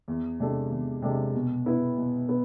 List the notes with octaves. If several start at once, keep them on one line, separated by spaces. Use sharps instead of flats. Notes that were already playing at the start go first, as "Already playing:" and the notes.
E2
C3 G#3 D4 A4
E2
C3 G#3 D4 A4
B2
B3 E4
B2
B3